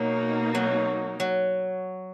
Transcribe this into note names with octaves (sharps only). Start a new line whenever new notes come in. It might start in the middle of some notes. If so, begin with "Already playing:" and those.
Already playing: B2 F#3 A#3 D#4
F#3
F#3